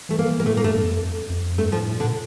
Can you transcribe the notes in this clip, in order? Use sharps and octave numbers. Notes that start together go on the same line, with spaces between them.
E3 A3
A#3
E3
A#3
A2 A3
A#3
G2 A3
G2
F2
F2
G2 A3
F3
A2
A#2
D3